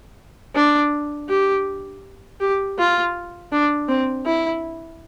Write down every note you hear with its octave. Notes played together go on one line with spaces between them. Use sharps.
D4
G4
G4
F4
D4
C4
E4